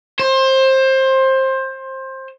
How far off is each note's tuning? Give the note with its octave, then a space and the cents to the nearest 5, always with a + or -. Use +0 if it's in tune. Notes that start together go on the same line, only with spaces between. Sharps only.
C5 +20